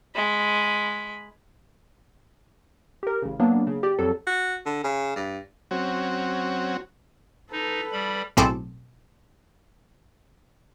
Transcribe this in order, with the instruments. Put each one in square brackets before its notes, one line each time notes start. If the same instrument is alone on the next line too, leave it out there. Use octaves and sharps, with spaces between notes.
[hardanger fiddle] G#3 B5
[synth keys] G4 A#4
A1 C#3
F#3 A#3 B3 D4
C#3
G4 D5
F2 F#3 A4
[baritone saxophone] F#4
D3
C#3
G2
[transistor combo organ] F#3 C4 C#4 F#4
[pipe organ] D#4 [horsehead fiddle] A4 B4
[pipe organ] G3 B5
[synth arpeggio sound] B1 A2 C4 G#4 A4 D6